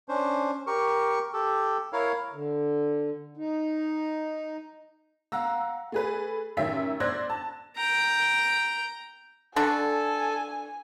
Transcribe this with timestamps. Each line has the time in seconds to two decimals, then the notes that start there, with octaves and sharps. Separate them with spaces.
0.08 C#4 D4 C5
0.67 G4 A#4 C#6
1.33 G4 A4
1.93 E4 A#4 C#5 F5
2.33 D3
3.37 D#4
5.32 F5 F#5 A#5 E6
5.92 A3 G#4 B4
6.57 A1 F#2 D#3 C#4 E5 B6
7.00 C5 D5 E6 F#6 G#6 A#6
7.30 A5
7.77 G5 A#5
9.56 D3 D4 A4 G#5 C#6